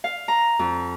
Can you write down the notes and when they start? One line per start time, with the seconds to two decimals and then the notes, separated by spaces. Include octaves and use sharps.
0.04 F5
0.28 A#5
0.59 F2